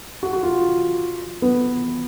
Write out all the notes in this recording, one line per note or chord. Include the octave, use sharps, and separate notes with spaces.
F#4
F#4
F4
B3